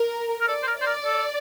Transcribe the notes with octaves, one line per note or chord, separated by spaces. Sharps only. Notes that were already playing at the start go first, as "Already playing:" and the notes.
Already playing: A#4
A#4
A4 D5
C5
A#4
C5 D5
A#4
A4